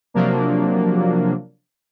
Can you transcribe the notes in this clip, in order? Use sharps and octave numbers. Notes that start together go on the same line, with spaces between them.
C3 F3 F#3 A#3 D4